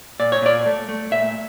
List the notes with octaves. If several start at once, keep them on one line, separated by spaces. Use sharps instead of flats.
A#2 D5
C#5
A#2 D5
A3
A3
A#2 E5